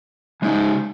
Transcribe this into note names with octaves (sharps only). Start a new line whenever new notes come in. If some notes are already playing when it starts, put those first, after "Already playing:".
C#3 G#3 D#4